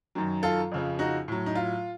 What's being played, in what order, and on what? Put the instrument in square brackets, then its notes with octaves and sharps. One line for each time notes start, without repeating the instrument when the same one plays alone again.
[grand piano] F#2 D#3 F#3
F4 A4
F2 C#3 F3
D#4 F#4
A2 F#3
D#4
F4